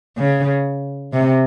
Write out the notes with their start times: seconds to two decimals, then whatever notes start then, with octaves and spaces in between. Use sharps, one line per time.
0.18 C#3
1.13 C3